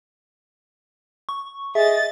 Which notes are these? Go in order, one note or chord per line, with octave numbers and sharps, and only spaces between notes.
C#6
G#4 D#5 E5 A6